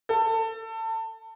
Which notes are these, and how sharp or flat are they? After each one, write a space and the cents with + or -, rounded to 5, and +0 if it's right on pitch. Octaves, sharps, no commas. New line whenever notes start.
A4 +25